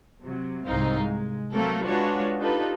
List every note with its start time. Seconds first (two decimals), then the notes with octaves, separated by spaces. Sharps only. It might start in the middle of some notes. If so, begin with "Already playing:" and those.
0.22 C3 F#3
0.66 C2 G#2 C4 D#4 F5
1.02 G#3
1.52 F#3 A3 A#3 C4 A4 A#4
1.86 G#3 D4 F4 F#4 B4 C#5
2.40 D4 D#4 F4 G4 A4 B4